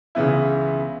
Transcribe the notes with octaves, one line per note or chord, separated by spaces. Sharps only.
C#2 C#3 E3 B3 E4